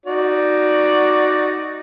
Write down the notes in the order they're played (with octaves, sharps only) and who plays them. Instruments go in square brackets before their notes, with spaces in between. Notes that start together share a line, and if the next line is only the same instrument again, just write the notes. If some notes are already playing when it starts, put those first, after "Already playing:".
[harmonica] D#4 F#4 D5